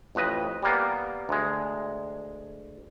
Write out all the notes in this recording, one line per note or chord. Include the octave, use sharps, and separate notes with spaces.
A1 F2 B4 D#5
G3 A#3 B3
D2 G#3